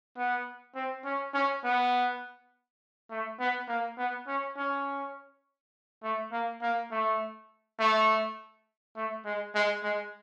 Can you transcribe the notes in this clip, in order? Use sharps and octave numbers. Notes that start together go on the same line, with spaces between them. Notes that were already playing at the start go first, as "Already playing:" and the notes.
B3
C4
C#4
C#4
B3
A3
B3
A#3
B3
C#4
C#4
A3
A#3
A#3
A3
A3
A3
G#3
G#3
G#3